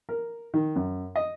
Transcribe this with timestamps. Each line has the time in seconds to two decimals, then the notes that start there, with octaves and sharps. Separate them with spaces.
0.09 A#4
0.54 D#3
0.76 F#2
1.16 D#5